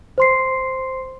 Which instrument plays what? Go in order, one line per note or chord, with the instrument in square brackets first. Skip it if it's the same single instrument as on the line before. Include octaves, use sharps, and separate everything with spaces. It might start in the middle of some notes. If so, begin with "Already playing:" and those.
[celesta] C5 C6 C7